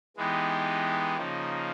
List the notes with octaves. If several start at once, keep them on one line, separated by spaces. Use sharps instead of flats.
E3 G#3 B3 D#4 G4
C#3 F3 A#3 D#4